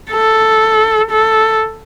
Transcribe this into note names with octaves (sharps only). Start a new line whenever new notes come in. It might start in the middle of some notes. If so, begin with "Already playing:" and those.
A4
A4